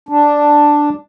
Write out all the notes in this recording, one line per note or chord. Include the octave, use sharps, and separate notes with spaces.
D4